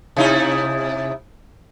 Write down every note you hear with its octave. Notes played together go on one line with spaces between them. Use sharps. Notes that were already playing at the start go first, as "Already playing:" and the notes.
C3 D#4 E4